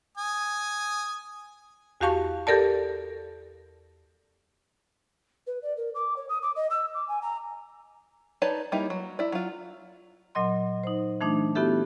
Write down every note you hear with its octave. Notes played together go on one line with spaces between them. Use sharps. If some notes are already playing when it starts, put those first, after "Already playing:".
G#5 D#6
E2 F#4 G4 F5 A5 C#6
G4 A4 A#4 D5 A5
B4
D5
A#4
D6
C#5
D#6
D6
D#5
E6
D6
G#5
A#5
D#4 B4 C#5 D5 A5
G3 A#3 D#4 E4
F#3
E4 D5
F#3 F4
A#2 F#3 D#5 C6
D#4 C5
E3 A3 D4 D#4
B3 E4 F#4 G4 A4 E5